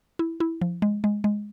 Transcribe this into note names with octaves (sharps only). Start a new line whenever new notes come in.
E4
E4
F3
G#3
G#3
G#3